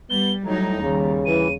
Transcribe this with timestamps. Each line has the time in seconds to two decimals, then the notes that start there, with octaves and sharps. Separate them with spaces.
0.10 G3 B3 G7
0.45 A2 F#3 G3 D#4 A#5
0.82 D#2 C#3 G3
1.26 E3 D#7